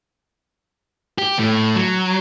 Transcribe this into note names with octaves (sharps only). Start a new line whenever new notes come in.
G4
A2 A3
F#3